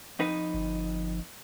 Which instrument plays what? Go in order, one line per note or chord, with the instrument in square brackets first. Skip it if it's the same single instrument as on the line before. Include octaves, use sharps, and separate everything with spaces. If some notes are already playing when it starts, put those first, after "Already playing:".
[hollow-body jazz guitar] F2 D#4 B4
[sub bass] G1